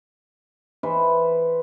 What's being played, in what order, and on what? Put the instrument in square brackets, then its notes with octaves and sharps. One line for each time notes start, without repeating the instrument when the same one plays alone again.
[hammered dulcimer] E3 B4 C5